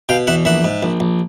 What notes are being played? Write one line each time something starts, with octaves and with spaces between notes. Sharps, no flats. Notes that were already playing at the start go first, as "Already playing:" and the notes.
B2 F5 G5
E2 E5 F#5
A#1 E5 F#5
G#2
A#1
A#1